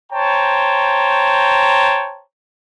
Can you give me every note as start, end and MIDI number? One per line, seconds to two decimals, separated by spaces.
0.12 2.23 72
0.12 2.23 73
0.12 2.23 79
0.12 2.23 81
0.12 2.23 82